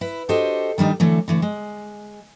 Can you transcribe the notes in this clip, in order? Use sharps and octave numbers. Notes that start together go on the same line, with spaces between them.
E4 B4
D4 F#4 G4 A4 C5 D#5
D#3 G3 D4 D#4
D3 E3 F#3 A3
D3 E3 A3
G#3